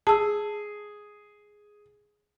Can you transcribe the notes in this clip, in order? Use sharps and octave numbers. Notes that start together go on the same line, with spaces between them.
G#4 A5 E6